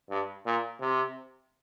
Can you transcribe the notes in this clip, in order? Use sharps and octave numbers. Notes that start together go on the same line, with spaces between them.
G2
A#2
C3